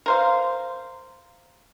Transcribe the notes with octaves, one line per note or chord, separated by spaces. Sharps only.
A#4 C5 F5